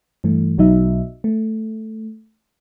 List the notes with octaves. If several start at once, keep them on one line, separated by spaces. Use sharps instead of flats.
G2 E3 A3
B1 B2 F#3 D#4 E5
A3